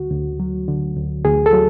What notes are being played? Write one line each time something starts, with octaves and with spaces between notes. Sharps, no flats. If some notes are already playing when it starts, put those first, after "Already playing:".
Already playing: D2 D3 F#4
D2
F#3
D3
D2
D2 G#4
A4
F#3